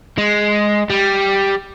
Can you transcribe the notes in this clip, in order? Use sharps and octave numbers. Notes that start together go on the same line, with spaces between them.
G#3
G3